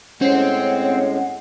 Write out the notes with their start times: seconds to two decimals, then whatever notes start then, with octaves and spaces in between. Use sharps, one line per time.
0.21 A2 G#3 C4 C#4 C#5 F#5 C7